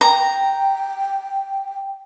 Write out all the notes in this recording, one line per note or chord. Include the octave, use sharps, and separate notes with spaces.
G5 A#5